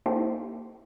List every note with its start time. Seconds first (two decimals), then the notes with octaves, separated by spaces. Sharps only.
0.06 A#3 D#4 E4 G4 A4 C5